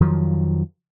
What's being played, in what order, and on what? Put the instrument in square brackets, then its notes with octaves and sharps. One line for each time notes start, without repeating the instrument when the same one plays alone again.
[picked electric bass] F2 D#3 F3 F#3